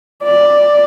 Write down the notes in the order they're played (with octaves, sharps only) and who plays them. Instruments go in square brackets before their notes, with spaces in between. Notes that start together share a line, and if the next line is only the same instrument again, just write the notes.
[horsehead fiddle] D5